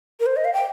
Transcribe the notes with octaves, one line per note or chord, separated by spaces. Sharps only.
A#4
C5
D#5
F5
G5